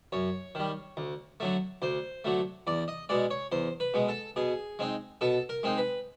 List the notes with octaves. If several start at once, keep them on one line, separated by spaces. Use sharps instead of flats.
F#2 C#5
D#3 G3
D2
D3 F#3 A3
D2 C5
D3 F#3 A3
E2 D5
D#5
B2 G#3 D5
C#5
E2 C5
B4
B2 G#3
A4
B2 G#4
G#3 C4 D#4
B2 A4
A#4
G#3 C4 D#4
B4